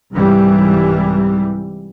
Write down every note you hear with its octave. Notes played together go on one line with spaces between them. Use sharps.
C2 G#2 E3 G3